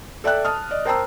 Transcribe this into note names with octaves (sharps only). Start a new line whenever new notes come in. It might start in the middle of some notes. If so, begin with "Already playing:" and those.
A4 D5 E5 G5 F#6
A5 D#6 F6
D5 D#5
A#4 C5 G5 A5 A#5 E6